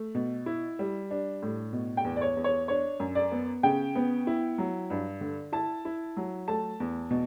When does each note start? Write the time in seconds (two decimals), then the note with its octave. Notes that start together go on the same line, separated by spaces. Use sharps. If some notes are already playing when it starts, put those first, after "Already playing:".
Already playing: A3
0.15 B2
0.46 E4
0.79 G3
1.11 D4
1.42 A2
1.73 B2
1.97 G5
2.04 E2
2.16 D5
2.21 C#5
2.36 E2
2.44 C#5
2.68 D4 C#5
3.00 F#2
3.15 D5
3.32 B3
3.63 C#3 G5
3.95 B3
4.27 E4
4.58 F#3
4.90 G2
5.21 D3
5.52 E4 A5
5.85 E4
6.17 F#3
6.48 A3 A5
6.80 E2
7.11 B2